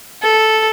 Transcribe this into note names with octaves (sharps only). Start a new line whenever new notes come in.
A4